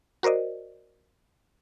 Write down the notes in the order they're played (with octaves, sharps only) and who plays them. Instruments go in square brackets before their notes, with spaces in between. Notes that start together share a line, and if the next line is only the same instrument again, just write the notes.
[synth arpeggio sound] F#4 A#4 C5 D5 D#5